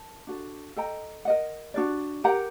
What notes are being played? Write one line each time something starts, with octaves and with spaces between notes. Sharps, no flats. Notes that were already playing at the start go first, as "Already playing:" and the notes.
Already playing: A#4 A5
D4 F#4 A4
A4 D#5 G5 A#5
A#4 D#5 F#5
D4 F#4 A#4 D5
G4 A#4 F#5 A#5